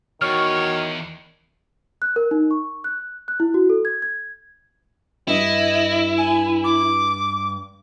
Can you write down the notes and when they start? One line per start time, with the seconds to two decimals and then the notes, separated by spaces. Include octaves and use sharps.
0.21 E2 D#3 F#4 C#5 F6
2.02 F#6
2.16 A#4
2.31 D#4
2.51 C#6
2.84 F#6
3.28 F#6
3.40 E4
3.54 F#4
3.70 A4
3.85 G#6
4.02 G#6
5.28 G2 E4 D#5
6.18 G#5
6.63 D6